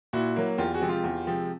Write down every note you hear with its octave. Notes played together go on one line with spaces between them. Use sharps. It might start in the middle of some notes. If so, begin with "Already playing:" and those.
A#2 E4 F#4
F#3 A#3
E2 F4 G4
F#4 G#4
C3 F3 G#3 C4
F4 G4
E2
C3 F3 G#3 C4